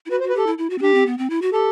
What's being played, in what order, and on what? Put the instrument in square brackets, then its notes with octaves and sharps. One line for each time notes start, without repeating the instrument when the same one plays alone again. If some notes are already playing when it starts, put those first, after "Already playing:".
[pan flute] E4
[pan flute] F#4 [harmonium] B4
[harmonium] C5
[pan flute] F#4
[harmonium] B4
[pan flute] G4 [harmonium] A4
[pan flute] E4
E4
F#4
C4
[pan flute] D4 [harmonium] G4
[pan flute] C4
B3
C4
E4
F#4
[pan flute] G4 [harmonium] A4